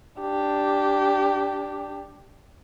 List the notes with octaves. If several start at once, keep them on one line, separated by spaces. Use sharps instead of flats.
D4 G4